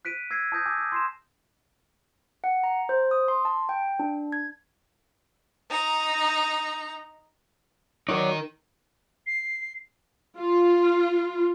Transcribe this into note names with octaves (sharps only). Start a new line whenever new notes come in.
F#6 B6 D7 D#7
E6 G#6 A#6 C7
A5 D#6 G6 A#6
G#5 D6 E6
G6
C6 C7 E7
F#5
A#5
C5
D#6
C6
A5
G5
D4
G#6
D#4 A#5
F#3 D#4 A#4 C#5 D5
C7
F4